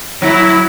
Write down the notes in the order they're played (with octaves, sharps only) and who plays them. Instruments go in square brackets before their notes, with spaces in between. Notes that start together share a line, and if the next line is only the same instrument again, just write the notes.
[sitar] F#3 [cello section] E4